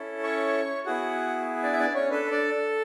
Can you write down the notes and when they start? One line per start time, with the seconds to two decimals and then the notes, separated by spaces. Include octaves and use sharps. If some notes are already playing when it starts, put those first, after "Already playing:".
Already playing: C#4 E4 A4
0.23 C#5 C#6
0.86 B3 E4 F#4 G#4 F#5
1.63 D4 D5
1.73 E5
1.79 D4 D5
1.95 C#4 C#5
2.10 D4 A4 B4
2.31 D4 D5